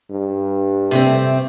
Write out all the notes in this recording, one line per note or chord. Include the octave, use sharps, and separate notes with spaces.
G2
C3 A3 C4